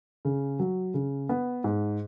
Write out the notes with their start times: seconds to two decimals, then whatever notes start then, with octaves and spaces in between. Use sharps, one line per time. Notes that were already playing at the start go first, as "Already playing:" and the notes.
0.25 C#3
0.59 F#3
0.94 C#3
1.29 B3
1.64 G#2